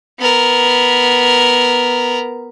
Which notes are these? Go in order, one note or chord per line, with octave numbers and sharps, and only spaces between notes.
B3 A#4